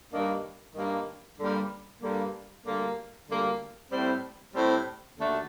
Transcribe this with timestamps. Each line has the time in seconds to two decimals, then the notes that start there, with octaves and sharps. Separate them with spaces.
0.12 G2 D#3 G3 A#3 D4
0.75 G2 D#3 G3 A#3 D4
1.38 G2 D3 G3 A#3
2.01 G2 D3 G3 A#3
2.64 D2 D3 G3 A#3
3.27 D2 D3 G3 A#3
3.90 A2 G3 C4
4.53 A2 G3 C4
5.16 D#2 D3 A3 D4 F#4